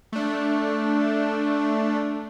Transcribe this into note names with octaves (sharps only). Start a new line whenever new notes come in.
A3 D4